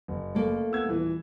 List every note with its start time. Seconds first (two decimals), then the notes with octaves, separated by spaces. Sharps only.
0.08 F#1
0.35 A3 A#3
0.72 B3 E6 G#6
0.85 D#1 E3